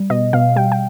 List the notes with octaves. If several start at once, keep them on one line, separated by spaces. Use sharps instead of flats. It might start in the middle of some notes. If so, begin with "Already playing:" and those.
Already playing: G3
B2 D#5
B2 F5
G3 G5
G5